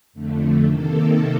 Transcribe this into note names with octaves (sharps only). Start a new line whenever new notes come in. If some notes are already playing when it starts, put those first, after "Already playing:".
F2 D3 A3
C3 D#3 A#3 A4